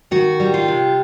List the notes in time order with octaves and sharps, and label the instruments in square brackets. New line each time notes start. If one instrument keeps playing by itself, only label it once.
[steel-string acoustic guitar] D#3 F#4
G3
F4
C3